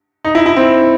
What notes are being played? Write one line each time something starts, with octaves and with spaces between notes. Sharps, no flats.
D#4
E4
E4
C4